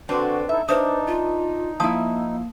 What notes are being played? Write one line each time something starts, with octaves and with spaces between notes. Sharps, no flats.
D3 C4 D4 F#4 B4
D#4 E4 A4 E5
D4 D#4 B4 C5 E5 D#6
F4
F3 A#3 E4 A5 D#6